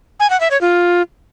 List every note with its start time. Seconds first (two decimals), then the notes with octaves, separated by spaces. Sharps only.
0.20 G#5
0.30 F#5
0.40 E5
0.51 C#5
0.61 F4